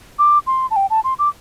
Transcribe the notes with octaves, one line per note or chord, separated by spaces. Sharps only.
D6
C6
A5
G5
A5
C6
D6